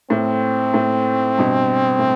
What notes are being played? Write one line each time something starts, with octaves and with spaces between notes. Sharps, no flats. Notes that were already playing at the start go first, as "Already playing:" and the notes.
A2 C4
A2
G2 B2
A2